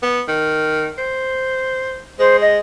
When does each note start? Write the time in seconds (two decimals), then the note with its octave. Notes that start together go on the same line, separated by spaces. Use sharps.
0.02 B3
0.28 D#3
0.98 C5
2.19 G#3 C5
2.42 D#5